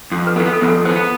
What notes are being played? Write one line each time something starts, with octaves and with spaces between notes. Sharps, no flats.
F2
B4
B3 A4
A4
F2
A4
B3 C5